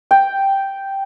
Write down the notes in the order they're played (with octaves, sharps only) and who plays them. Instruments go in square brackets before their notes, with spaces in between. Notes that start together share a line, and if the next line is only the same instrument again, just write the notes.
[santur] G5